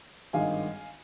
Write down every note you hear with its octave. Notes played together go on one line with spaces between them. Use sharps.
G#1 G2 D#3 G#3 F5 G#5